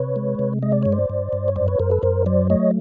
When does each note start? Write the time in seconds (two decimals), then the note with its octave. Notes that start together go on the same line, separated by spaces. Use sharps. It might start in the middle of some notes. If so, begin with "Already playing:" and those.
Already playing: C3 B4 C#5
0.16 G#3
0.39 C3
0.63 G#3 D#5
0.72 D5
0.83 G2 C#5
0.92 C5 D5
1.10 G2
1.33 G2
1.48 C#5
1.56 F#2 C5 D5
1.68 B4 C#5
1.80 F#2 A#4 C5
1.91 A4 B4
2.03 F#2 A#4 C5
2.26 F#3 C5 D5
2.50 A3 C#5 D#5